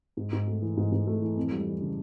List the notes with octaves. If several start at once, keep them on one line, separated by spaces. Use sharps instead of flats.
G#2
G#2
A3
E3
G#2
G#2
A3
E3
F2
G3
E3
C#3